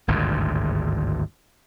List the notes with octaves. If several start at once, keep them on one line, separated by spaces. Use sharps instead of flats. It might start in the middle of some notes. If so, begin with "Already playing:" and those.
G#1 D2 G2 A#2